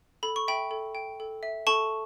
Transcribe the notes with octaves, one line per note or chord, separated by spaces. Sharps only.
A4 B5
C#6
E5 G5 B5
A4
G5
A4
E5
A4 A5 C#6